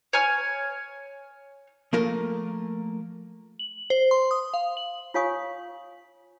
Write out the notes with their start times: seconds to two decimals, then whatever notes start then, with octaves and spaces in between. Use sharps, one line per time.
0.13 C#5 G#5 F6
1.93 F3 A3 A#3 A#4
3.59 F#7
3.90 C5
4.11 C6
4.31 D#6
4.54 F5
4.77 F#7
5.14 F4 C#5 F5 G#5 C#6 D#6